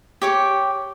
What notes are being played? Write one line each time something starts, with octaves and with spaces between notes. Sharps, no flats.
G4 C#5 D6